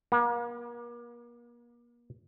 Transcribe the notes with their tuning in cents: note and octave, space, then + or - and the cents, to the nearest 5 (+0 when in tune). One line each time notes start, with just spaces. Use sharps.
A#3 +40